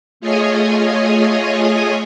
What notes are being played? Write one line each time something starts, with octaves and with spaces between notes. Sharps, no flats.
A3 F4 G#4 C#5 D#5 G#5